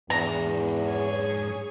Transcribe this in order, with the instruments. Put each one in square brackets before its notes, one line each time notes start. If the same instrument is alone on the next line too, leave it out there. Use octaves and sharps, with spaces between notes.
[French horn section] E2 [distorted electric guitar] G#2 D4 [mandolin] A#5
[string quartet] G#4 C#5 G#5